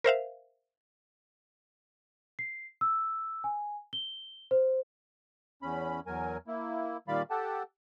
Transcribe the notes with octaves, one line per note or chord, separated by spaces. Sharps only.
A#4 C5 E5 F5
C7
E6
G#5
G7
C5
E2 C#4 B5
E2 F#3 A#4 G#5
A#3 E4
A#2 D#3 G3 D5 F5 B5
G4 A4 F#5 G5 A5